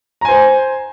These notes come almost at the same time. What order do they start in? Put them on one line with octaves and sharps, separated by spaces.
A#5 G#5 C5